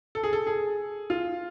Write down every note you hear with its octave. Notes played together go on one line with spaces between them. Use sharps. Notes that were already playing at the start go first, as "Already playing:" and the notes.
A4
G#4
A4
G#4
F4